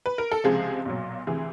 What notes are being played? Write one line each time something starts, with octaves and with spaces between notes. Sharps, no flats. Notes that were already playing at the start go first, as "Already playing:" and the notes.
B4
A#4
A4
C#2 C3 F3 G#3 G#4
B1 A#2 F#3
D2 C3 E3 G#4